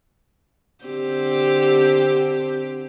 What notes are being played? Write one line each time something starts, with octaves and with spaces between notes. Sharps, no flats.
D3 C4 G4